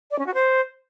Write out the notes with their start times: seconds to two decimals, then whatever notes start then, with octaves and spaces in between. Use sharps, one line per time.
0.11 D5
0.19 C#4
0.26 F#4
0.34 C5